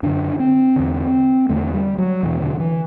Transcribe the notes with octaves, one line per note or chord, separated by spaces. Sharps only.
F#2 D3 D4
C4
E2 D3
E2 D3 A3
G3
F#3
E2 B2 E3
D3
E3